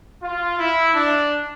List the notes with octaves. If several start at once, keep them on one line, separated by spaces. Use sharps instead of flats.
F4
E4
D4